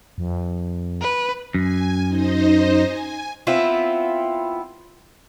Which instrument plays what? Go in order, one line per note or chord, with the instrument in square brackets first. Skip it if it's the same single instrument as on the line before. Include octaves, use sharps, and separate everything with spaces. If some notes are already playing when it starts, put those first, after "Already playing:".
[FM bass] F2
[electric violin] B4
[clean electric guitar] F#2 [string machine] G#5
[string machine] D#4 C5 D#5
G#5
[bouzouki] B3 C4 E4 F4